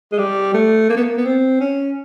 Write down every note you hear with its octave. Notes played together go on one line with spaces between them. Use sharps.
G#3
G3
A3
A#3
B3
A#3
B3
C4
C#4